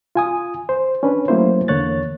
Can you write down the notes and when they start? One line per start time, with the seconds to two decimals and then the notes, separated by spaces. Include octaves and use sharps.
0.15 F4 G#5 D#6
0.69 C5
1.03 C#4 D4 B4
1.28 F#3 A3 A#3 C#4 E4 C5
1.68 E2 D3 A#3 C#5 F#6 A6